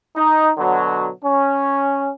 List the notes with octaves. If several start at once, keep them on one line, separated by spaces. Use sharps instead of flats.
D#4
B2 D3 F#3
C#4